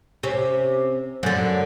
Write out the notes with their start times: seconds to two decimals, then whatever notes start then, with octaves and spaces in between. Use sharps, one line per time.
0.23 C3 C#4
1.23 F#2 D3